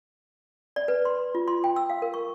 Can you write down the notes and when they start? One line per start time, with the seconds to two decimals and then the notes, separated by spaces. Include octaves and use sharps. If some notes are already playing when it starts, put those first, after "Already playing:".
0.76 D5
0.88 B4
1.05 C6
1.35 F4
1.48 C6
1.64 G5
1.76 E6
1.90 F5
2.02 A#4
2.14 C#6